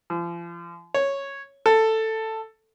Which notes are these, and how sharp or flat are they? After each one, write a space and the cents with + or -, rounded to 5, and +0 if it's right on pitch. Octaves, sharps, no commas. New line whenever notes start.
F3 -35
C#5 -5
A4 +10